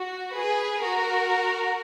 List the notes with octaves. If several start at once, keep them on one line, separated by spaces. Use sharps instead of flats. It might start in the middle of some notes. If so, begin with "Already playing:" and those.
Already playing: F#4
G#4 B4
F#4 A#4